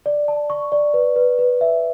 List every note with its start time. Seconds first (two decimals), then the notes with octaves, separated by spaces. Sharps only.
0.06 D5
0.28 A5
0.50 C#6
0.72 D5
0.94 B4
1.16 B4
1.39 B4
1.61 E5